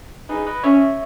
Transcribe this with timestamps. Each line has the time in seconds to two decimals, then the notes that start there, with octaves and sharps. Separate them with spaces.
0.29 D#4 G#4 B4
0.46 B4 D#5
0.64 C#4 C#5 E5